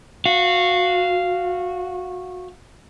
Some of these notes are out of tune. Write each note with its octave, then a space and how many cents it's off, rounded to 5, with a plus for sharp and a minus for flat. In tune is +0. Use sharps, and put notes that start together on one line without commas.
F#4 -20 F5 -10